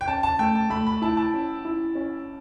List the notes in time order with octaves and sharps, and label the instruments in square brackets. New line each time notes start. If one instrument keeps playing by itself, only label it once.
[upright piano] G5
[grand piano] C#4 [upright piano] A5
[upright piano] A5
[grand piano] A3 [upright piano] G5
[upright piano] A5
[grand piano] A3 [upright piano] B5
[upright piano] B5
[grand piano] E4 [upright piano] A5
[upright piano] A5
[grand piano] C#4
E4
C#4